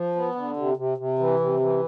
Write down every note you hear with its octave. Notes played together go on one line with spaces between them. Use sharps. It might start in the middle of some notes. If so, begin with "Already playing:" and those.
Already playing: F3
B3
D3
C3
C3
C3
E3
C3
E3